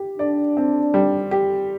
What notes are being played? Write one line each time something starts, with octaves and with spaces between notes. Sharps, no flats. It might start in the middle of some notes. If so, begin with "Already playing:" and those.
Already playing: G4
D4 D5
C4
G3
G4